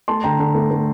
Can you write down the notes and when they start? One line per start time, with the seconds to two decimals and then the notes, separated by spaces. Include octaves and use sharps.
0.08 A3 A5 C6
0.24 D3 G5 A#5
0.39 D3
0.55 A3
0.71 A3